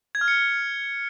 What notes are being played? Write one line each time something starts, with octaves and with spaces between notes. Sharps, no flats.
G#6
F6
C#7